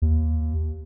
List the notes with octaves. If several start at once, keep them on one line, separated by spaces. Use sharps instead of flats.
D#2